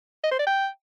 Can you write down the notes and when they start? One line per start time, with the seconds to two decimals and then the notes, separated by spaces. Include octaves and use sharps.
0.24 D#5
0.31 C5
0.39 D5
0.47 G5